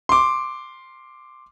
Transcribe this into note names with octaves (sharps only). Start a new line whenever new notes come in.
C6 D6